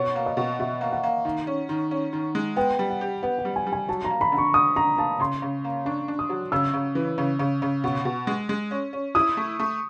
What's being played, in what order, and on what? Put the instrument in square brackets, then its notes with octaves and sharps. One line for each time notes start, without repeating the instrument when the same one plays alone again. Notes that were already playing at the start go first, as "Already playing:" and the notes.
Already playing: [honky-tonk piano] B2 [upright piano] C#5
[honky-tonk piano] A#3
[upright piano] D#5
[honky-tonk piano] B2
[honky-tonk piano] B2 [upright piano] E5
[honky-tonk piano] A#3
[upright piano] F#5
[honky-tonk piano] A#3
D#3
C#4
D#3
C#4
D#3
G#3
[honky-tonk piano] B3 [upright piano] G5
[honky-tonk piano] G3
[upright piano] F#5
[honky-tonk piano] G4
[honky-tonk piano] B3 [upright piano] F#5
[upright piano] F#5
[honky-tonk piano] G3
[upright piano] G#5
[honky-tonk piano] G3
[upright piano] G#5
[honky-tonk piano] F#3 [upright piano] A5
[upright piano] A#5
[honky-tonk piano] A#3
[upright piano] B5
[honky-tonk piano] D3
[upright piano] C#6
[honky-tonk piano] D3 [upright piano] D#6
[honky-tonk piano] D3 [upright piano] A#5
[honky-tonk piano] A#3 [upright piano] A5
[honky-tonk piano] C#3 [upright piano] C6
[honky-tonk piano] C#3
A#3
[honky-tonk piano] D4 [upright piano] C#6
[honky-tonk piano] D4
[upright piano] D#6
[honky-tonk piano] F#3
[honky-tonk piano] C#3 [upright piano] E6
[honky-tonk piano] C#3
E3
C#3
C#3
C#3
B2
B2
G#3
G#3
C#4
C#4
[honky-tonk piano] E4 [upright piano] D#6
[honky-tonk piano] A3
A3